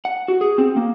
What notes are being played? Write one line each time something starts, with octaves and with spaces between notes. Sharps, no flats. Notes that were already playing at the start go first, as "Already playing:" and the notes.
F#5
F#4
G#4
C4
A#3